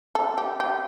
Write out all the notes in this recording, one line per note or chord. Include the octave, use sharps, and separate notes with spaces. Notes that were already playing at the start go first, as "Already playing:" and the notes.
A4
G4
G4